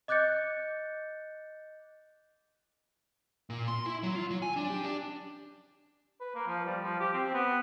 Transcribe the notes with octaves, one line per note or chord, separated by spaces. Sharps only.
D#5 D6 F#6 G6 A6 C#7
A#2
C6
E4
F#3
F4
F#3
G#5
D4
G4
D4
B4
A#3
F3
G3
F3
G4
C4
B3